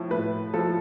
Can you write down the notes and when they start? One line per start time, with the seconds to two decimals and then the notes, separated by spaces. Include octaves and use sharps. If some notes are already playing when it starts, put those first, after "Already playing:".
Already playing: A2 F3
0.11 A2 B4
0.54 F3 A4